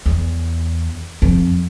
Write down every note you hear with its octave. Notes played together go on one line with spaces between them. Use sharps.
E2
F2